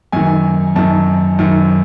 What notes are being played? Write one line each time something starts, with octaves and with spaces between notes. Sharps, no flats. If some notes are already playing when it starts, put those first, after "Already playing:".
F#2 D#3 G#5
F#2 D#3 A5
F#2 D#3